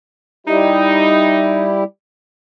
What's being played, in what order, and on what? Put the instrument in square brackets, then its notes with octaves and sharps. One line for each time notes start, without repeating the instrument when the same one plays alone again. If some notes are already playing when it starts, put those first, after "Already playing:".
[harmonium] G3 E4 G4 [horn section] D#4